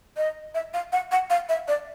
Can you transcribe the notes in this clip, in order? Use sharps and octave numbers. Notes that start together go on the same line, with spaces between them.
D#5
E5
F5
F#5
F#5
F5
E5
D5